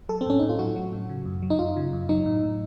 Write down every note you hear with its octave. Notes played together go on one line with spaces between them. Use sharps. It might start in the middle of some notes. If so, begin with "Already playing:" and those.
F#3 A4
C4
A2 C#4
A2 D#4
F4
F#3 F#4
F#3
A2
C#3
F#2
F#3
D#4
F#2 F4
C#3
F#2
F#3 D#4
A2
A2